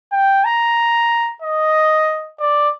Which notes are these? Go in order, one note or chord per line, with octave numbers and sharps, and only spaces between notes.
G5
A#5
D#5
D5